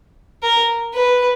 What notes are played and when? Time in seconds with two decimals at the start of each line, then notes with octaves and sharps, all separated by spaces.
0.43 A#4
0.94 B4